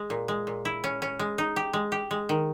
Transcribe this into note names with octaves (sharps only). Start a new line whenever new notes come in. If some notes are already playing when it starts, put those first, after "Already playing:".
Already playing: G#3
A#2
G#3
A#2
E4
C#4
C#4
G#3
D#4
G4
G#3
G4
G#3
D#3